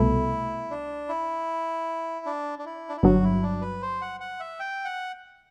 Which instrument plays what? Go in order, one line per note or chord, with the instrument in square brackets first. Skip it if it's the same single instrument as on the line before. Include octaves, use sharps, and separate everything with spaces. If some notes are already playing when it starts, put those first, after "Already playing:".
Already playing: [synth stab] C2 B2 A3 [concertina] E4
[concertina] D4
E4
D4
D4
E4
D4
E4
[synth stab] G1 G2 F#3 [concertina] F#4
[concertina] E4
D4
B4
C5
F#5
F#5
E5
G5
F#5